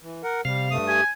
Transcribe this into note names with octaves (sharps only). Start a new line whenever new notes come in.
E3
A#4 F#5
C3 G3 F5
G2 A3 D#6
G4 G#5